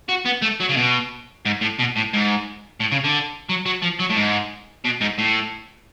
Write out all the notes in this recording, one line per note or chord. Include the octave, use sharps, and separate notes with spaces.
F#4
B3
A3
F#3
C#3
B2
G#2
A2
B2
A2
G#2
A2
C#3
D3
F#3
F#3
F3
F#3
A2
G#2
B2
G#2
A2